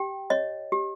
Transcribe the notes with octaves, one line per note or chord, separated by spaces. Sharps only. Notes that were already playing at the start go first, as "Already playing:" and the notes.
Already playing: G4 G5
C#5 D#5
G4